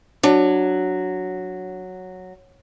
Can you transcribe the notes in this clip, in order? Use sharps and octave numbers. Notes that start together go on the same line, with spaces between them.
F#3 D4